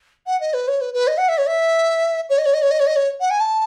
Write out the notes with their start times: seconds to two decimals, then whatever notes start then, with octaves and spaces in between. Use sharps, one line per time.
0.26 F#5
0.40 D#5
0.53 B4
0.68 C#5
0.81 B4
0.94 B4
1.07 D#5
1.17 F#5
1.28 E5
1.38 C#5
1.47 E5
2.29 C#5
2.38 D#5
2.45 C#5
2.53 D#5
2.62 C#5
2.71 D#5
2.79 C#5
2.86 D#5
2.96 C#5
3.20 F#5
3.30 G#5
3.40 A5